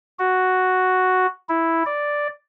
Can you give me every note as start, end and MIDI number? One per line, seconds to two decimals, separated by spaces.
0.19 1.26 66
1.49 1.83 64
1.86 2.28 74